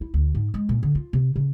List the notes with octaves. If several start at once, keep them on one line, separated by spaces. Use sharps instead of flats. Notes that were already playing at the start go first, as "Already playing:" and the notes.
E4
D2
G#2
G#3
A#2
D3
F4
C3
C#3